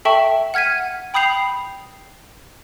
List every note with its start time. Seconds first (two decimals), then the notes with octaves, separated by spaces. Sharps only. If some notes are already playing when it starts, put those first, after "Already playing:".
0.05 A4 E5 G5 A5 C#6
0.54 F#5 F6 G#6 B6 D#7
1.14 G5 B5 D#6 G6 C7 F7